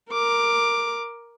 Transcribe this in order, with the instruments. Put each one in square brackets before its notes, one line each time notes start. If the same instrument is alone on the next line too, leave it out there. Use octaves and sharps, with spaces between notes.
[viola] A#4 D6